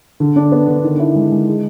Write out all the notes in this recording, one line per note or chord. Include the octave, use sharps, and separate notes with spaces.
D3
D4
B3
D3
D#3
E4
G#3
G#3
G#4